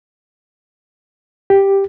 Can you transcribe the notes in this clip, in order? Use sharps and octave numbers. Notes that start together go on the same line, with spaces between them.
G4